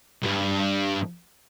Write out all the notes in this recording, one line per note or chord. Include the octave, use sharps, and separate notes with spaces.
C2 G2